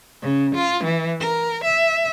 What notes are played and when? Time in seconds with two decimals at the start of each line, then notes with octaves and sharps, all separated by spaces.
0.22 C#3
0.55 F4
0.84 E3
1.21 A#4
1.64 E5